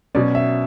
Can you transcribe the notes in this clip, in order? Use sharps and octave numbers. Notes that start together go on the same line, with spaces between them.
B2 F#3 C#4 D5
E5